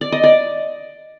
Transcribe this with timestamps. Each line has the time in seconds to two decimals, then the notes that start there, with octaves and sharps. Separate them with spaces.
0.01 D5
0.12 D#5
0.24 D5